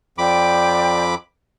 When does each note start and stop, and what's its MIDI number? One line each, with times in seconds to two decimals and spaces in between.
0.18 1.15 41
0.18 1.04 74
0.18 1.04 79
0.18 1.15 83
0.18 1.15 86